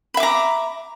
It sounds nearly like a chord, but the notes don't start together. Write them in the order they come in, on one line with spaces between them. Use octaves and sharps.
B5 E5 D6 A#5